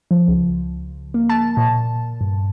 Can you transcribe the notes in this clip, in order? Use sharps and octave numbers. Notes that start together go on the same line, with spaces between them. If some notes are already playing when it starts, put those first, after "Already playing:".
F3
C#2
A#3
A5
A#2
G2